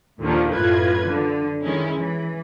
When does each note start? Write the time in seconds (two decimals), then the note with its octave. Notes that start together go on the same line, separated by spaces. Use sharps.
0.20 D#2 A#2 D3 D#3 F3
0.54 F#2 A2 F4 B4 G#6
1.09 D3
1.63 D#3 G#3 C#4 E4
1.99 E3